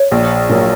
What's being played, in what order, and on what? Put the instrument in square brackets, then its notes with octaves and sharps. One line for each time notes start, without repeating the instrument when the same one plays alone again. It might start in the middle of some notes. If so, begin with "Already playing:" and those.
Already playing: [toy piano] C#5
[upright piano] A#1
A#2 F#3 A#3